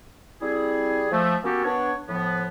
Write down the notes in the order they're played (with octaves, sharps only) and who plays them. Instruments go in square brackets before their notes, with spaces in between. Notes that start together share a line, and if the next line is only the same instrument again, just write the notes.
[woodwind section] G3 C4 E4 G#4
F3 A3
A#3 B3 C#4 F#4 G4 A4
B3 D4 C#5
A2 F3 B3